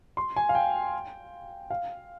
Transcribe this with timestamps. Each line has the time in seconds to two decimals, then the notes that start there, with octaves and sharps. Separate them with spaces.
0.17 C6
0.36 G#5
0.49 F5
0.55 G5
1.70 F5